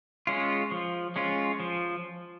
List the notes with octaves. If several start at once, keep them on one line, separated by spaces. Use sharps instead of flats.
G#3 C#4 F4
F3
G#3 C#4 F4
F3